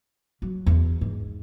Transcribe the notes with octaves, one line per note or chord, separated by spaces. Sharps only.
F#3
E2
G#2